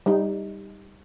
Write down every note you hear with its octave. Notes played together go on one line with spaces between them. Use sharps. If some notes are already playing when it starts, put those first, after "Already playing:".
G3 D#4